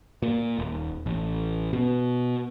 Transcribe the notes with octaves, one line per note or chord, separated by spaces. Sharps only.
A#2
D#1
A1
B2